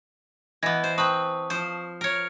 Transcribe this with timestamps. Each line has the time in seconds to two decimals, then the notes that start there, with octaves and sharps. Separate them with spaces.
0.63 E3 B3 D#5 G#6 A#6
0.84 C5
0.98 C4 B4 A5 C#6 D#6
1.50 F3 C5
2.01 A#4 C#5